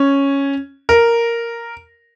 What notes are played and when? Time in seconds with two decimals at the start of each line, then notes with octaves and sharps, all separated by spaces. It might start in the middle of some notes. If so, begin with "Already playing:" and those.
Already playing: C#4
0.89 A#4